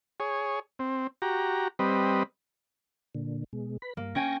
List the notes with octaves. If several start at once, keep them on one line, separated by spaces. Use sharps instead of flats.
G#4 C#5
C4
F#4 G4 A#5
G3 C4 B4 D#5
A#2 D3
B2 G#3
B4 B5
G2 A#3
C#4 G5 G#5 C#6 G#6 A#6